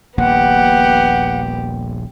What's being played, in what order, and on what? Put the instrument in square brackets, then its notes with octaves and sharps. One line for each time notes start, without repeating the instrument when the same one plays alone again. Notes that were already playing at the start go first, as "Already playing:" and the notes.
[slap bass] D#1 A#1 A#3 [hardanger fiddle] B3 G4 [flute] F#5